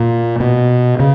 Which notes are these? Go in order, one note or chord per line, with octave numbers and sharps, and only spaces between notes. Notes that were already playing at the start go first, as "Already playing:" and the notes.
Already playing: A#2
B2
C#3